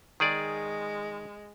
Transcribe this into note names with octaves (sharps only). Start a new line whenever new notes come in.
D#3 G#3 G#4 D5